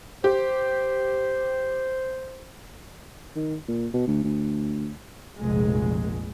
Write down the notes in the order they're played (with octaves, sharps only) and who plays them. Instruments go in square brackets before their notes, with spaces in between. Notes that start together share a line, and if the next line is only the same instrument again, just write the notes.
[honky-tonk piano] G4 [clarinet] C5
[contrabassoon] D#3
A#2
B2
D2
D2
[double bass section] F1 A#1 G#3